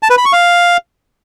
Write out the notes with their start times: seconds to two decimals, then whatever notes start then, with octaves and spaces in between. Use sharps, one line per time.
0.03 A5
0.10 B4
0.18 B5
0.25 C#6
0.33 F5